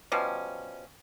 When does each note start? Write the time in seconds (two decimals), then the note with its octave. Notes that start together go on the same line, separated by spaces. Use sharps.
0.12 B2 F3 G3 C#4